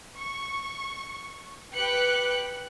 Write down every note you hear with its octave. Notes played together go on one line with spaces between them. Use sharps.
C#6
G4 B4 G5 F#6 C#7